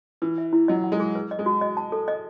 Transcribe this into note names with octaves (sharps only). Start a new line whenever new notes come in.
E3 B4
E5
E4
F#3 D#5
F#5
G#3
G#4
B4
D#5
G#3
F#4
D#5
A5
A4
D#5